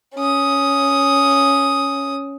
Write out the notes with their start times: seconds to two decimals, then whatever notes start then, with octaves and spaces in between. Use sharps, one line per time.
0.15 C#4 D#6